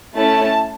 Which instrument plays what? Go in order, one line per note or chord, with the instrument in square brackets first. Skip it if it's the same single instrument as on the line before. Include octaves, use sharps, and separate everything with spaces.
[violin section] A3 C#4 E4 A5